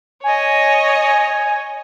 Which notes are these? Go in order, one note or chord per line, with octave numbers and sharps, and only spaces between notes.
C#5 D#5 G#5